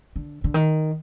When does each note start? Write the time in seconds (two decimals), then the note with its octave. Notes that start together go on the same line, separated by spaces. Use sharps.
0.16 D3
0.44 D3
0.54 D#3